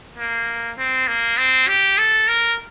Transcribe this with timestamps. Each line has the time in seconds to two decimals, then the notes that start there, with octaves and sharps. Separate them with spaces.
0.18 A#3
0.78 C4
1.08 A#3
1.38 C4
1.68 G4
1.98 A4
2.28 A#4